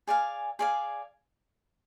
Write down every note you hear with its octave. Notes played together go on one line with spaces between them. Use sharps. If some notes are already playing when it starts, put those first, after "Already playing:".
G#4 D5 F5 G#5
G#4 D5 F5 G#5